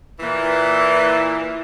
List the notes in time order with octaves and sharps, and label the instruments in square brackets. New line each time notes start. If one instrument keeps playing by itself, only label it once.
[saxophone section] A#2 E3